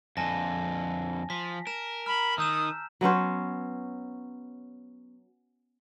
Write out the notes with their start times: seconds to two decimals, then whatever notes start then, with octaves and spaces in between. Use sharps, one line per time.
0.17 F2 D3 G#5 A5 A#6
1.30 F3 B6
1.67 A#4 E7
2.06 A#5 B5 F6
2.38 D#3 D#6 E6 G6 E7
3.01 F#3 B3 C#4 C5